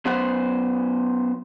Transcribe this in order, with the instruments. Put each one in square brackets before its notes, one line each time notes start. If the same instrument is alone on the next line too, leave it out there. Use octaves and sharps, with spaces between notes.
[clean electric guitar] F#3 B3 C#4 C5 F#5